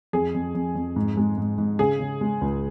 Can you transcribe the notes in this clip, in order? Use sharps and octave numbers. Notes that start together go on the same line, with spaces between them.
F2 G#4
F2
F2
F2
G#2
G#3
G#2
G#2
C#3 G#4
C#3
G#3
C#2